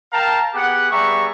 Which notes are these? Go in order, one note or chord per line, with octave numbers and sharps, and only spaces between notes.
A#4 F5 G5 A5 A#5
B3 G4 G#4 F#5
G3 B3 G#4 E5 A#5 C#6